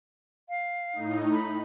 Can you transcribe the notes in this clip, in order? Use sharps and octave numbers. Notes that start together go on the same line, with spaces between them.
F5
A2 D#4
B5